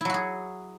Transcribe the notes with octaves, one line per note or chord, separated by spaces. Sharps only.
F#3 E4 F#4 G#4